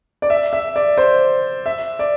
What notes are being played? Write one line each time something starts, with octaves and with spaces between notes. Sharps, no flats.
D5
E5
E5
D5
C5
E5
D5